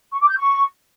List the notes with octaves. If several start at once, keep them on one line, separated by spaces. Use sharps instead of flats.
C#6
D6
G6
C#6